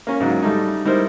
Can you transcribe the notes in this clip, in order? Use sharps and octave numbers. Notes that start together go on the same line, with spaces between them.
A#3 C#4
G#2 C#3 F#3
G3 A3 D#4
G3 D#4 E4 A#4 C5